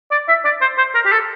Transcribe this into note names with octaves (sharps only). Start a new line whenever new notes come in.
D5
E5
D5
C5
C5
A#4
G4
A4